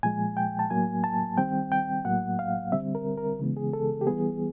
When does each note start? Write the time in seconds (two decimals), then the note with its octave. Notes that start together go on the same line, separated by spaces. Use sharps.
0.03 A#2 F3 G#3 G#5
0.37 G5
0.59 A5
0.70 A2 F#3 A#3 G#5
1.04 A5
1.37 D#3 G3 C4 G5
1.72 G5
2.05 A2 F#3 A#3 F#5
2.39 F5
2.72 D3 G3 C4 E5
2.95 A#4
3.17 A#4
3.39 C#3 E3 G#3 B3
3.57 G#4
3.73 A4
4.01 G4
4.07 E3 G3 B3 G#4